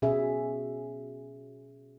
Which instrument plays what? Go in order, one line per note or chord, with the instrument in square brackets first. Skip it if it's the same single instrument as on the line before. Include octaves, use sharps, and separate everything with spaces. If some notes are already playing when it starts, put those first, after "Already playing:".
[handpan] B2 C#4 G#4 E5